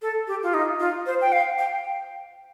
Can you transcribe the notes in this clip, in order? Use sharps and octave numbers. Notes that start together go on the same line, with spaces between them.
A4
G4
F4
D#4
F4
C5
G5
F5
G5